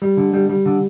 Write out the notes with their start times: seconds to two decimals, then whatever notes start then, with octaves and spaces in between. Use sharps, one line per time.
0.02 G3
0.17 D3
0.33 G3
0.49 G3
0.66 D3